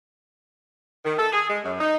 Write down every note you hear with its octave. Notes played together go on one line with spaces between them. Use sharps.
D#3
A4
G#4
G#3
F#2
D#4